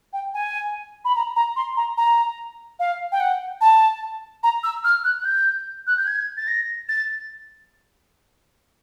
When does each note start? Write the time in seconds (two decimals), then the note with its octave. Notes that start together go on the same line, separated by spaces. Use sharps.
0.13 G5
0.34 G#5
1.05 B5
1.15 A#5
1.36 A#5
1.56 C6
1.77 A#5
1.97 A#5
2.79 F5
3.12 G5
3.20 F#5
3.61 A5
4.43 A#5
4.63 E6
4.84 F6
5.04 F#6
5.21 F#6
5.25 G6
5.87 F#6
5.97 G6
6.07 G#6
6.37 A6
6.48 A#6
6.89 A6